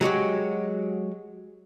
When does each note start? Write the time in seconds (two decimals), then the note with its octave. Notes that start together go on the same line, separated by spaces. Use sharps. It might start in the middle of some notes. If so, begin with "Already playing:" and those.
0.01 F#3 G#3 F#4 G4